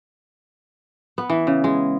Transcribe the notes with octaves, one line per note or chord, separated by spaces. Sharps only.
B3
E3
C#3
G#3